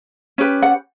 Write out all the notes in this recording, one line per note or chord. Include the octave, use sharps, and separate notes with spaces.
C#4 G4 B4
F#5